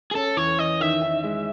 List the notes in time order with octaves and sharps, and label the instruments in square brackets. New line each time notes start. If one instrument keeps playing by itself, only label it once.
[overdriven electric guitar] G#4
[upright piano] C#4 [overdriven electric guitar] A4
[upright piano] E2 [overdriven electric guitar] C#5
[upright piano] E2 [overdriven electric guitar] D#5
[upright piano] D#3 [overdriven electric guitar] E5
[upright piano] D#3
G#3